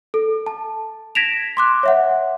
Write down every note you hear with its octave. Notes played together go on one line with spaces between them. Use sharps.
A4
A5
G#6 A#6 B6 D7 E7 F7
C6 D6 F#6
C#5 E5 F#5